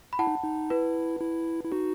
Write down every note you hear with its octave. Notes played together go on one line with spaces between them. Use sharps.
B5
E4 F#5 A5
D#4
D#4
E4 B4
E4
E4
D#4 F#4